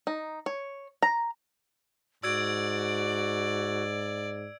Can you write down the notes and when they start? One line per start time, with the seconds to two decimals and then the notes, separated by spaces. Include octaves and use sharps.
0.07 D#4
0.46 C#5
1.03 A#5
2.23 G#2 F#4 D5 E6 G#6 D7